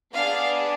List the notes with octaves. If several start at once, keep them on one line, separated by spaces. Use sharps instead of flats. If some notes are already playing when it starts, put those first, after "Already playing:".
B3 D4 G#4 F5